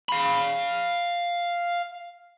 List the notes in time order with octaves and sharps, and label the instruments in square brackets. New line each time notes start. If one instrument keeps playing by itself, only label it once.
[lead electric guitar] F5 B5